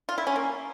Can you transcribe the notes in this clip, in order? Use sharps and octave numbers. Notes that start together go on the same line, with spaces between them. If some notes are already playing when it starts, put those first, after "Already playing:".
F4
E4
C#4
A#3